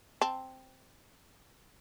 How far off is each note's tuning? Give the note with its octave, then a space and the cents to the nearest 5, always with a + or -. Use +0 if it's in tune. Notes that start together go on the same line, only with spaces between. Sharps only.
C4 +0 A5 +0